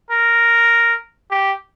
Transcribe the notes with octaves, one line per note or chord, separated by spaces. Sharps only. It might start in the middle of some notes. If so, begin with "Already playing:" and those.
A#4
G4